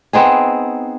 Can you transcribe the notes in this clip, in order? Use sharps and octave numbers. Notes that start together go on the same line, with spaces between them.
B3 C4 D#4 G#4